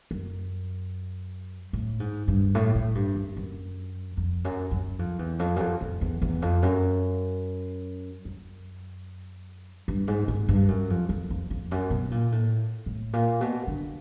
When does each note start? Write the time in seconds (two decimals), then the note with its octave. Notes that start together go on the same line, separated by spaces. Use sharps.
0.11 F#2
1.73 A2
2.00 G#2
2.28 G2
2.55 A2
2.75 A2
2.95 G2
3.15 F#2
3.36 F#2
4.17 F2
4.45 F#2
4.71 F#2
4.99 F2
5.19 E2
5.39 F2
5.56 F#2
5.60 F2
5.81 F2
6.01 E2
6.22 E2
6.42 F2
6.62 F#2
8.25 F#2
9.88 G2
10.08 G#2
10.28 G#2
10.49 G2
10.68 F#2
10.90 F2
11.09 F2
11.30 F2
11.50 F2
11.71 F#2
11.90 B2
12.11 A#2
12.32 A2
12.86 A2
13.13 A#2
13.41 B2
13.67 D3